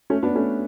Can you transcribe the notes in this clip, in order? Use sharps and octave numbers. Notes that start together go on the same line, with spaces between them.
A3 C#4
B3 D4
A3 C#4